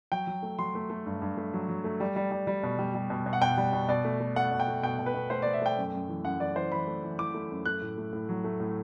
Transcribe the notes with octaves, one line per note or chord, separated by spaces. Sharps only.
F#3 G5
F#3
A3
F#3 C6
A3
A3
G2
G2
A3
F#3
F#3
A3
G3
G3
G3
G3
B2
G3
G3
B2
B2
F#5
B2 G5
G3
B2
B2 D5
A3
A3
A3 F#5
B2
G5
A3
B2 G5
B2
B4
B2
A3 C5
D5
A3
E5
A3 G5
F#2
F#2
E3
F#2 F#5
E3 D5
E3 C5
E3 B5
A3
E3
E3 D6
A3
F#2
A3 F#6
A2
A3
A2
F#3
A3
A2